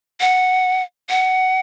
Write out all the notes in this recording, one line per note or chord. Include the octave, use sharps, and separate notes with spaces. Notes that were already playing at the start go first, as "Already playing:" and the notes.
F#5
F#5